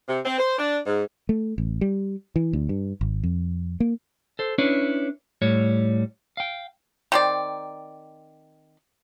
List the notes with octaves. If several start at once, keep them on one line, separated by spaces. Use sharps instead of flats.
C3
C4
C5
D4
G#2
A3
A1
G3
E3
D2
G2
G#1
F2
A#3
A4 C5
C#4 D4 E4 B4 C#5
A2 G3 C#5
F5 G5
D#3 C4 D5